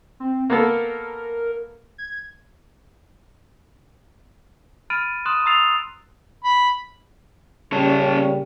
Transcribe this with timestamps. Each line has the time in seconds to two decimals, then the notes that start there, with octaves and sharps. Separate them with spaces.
0.20 C4
0.50 A#3 B3 A4 A#4
1.98 G#6
4.90 B5 F6 A6 D7 D#7
5.26 C6 D#6 F#6 D#7 E7
5.46 A#5 D#6 E6 A6 C7 F7
6.44 B5
7.72 A#2 C#3 G3 C#4 C#5 A5